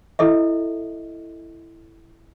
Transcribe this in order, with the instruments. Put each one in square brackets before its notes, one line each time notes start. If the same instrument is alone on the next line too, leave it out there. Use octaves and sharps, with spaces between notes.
[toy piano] E4 A4 D#5 E5